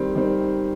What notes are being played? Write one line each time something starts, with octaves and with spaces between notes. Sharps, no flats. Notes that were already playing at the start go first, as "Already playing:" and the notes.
Already playing: D#3 G3 C4
D#3 G3 C4